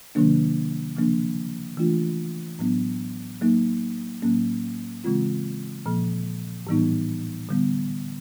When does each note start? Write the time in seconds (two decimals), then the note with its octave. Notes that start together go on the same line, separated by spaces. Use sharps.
0.15 C3 D#3 F#3 A#3 D4
0.96 C#3 F3 A#3 D4
1.77 E3 A3 D4 F4
2.59 A2 F#3 B3 D4
3.41 F#3 A#3 D#4
4.22 A2 F#3 A#3 C#4
5.04 C#3 E3 G#3 C4 F4
5.86 A#2 F3 A#3
6.67 A2 E3 G3 B3 D#4
7.49 D3 G3 B3